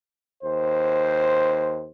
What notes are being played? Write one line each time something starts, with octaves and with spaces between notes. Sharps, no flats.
D#2 C5